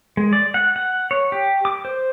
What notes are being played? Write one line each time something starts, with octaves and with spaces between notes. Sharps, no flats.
G#3
D5
F#5
F#5
C#5
G4
D6
C5